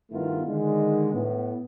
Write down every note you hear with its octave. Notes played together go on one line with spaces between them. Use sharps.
G2 D#3 A3 B3 E4 F4
D3 D#3 G#3
A2 B3